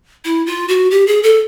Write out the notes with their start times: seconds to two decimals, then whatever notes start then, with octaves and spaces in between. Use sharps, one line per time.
0.25 E4
0.46 F4
0.68 F#4
0.91 G4
1.07 G#4
1.23 A4